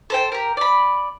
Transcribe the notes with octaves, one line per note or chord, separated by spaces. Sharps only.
A4 C5 G5
G4 A#4
D5 B5